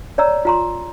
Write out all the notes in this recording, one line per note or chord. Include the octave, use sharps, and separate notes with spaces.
C#5 D5 A#5 E6
F4 A#5 C6